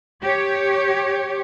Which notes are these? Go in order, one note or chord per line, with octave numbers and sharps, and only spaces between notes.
G4 C#5